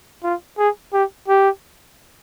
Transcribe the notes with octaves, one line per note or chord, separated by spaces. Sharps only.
F4
G#4
G4
G4